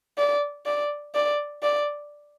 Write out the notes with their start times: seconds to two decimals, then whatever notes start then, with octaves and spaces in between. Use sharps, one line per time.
0.18 D5
0.66 D5
1.15 D5
1.63 D5